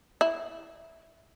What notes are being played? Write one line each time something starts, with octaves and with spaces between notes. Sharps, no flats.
E4